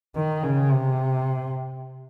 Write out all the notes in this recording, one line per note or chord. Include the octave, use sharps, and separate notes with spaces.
D#3
C#3
C3